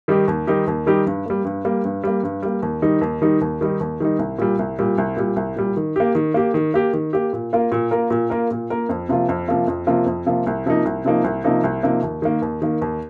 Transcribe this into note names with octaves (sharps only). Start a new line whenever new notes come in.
D#3 G3 D#4 G4
D#2
D#3 G3 D#4 G4
D#2
D#3 G3 D#4 G4
G2
G3 A#3
G2
G3 A#3
G2
G3 A#3
G2
G3 A#3
D#2
D#3 G3 D#4
D#2
D#3 G3 D#4
D#2
D#3 G3 D#4
D#2
D#3 G3 D#4
C2
A#2 G3
C2
A#2 G3
C2
A#2 G3
C2
A#2 G3
D#3
A#3 G4
D#3
A#3 G4
D#3
A#3 G4
D#3
A#3 G4
A#2
A#3 F4 A#4
A#2
A#3 F4 A#4
A#2
A#3 F4 A#4
A#2
A#3 F4 A#4
F2
C3 F3 A#3 F4
F2
C3 F3 A#3 F4
F2
C3 F3 A#3 F4
F2
C3 F3 A#3 F4
C2
C3 F3 A#3 D#4
C2
C3 F3 A#3 D#4
C2
C3 F3 A#3 D#4
C2
C3 F3 A#3 D#4
D#2
D#3 A#3
D#2
D#3 A#3
D#2